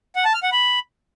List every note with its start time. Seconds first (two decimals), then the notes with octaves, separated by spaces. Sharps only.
0.16 F#5
0.25 A5
0.34 F6
0.43 F#5
0.52 B5